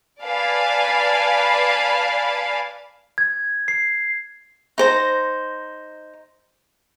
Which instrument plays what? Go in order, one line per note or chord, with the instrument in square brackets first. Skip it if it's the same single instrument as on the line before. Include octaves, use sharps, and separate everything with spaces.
[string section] B4 D5 F5 G#5 A5 B5
[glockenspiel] G#6
C7
[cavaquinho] D#4 C5 A#5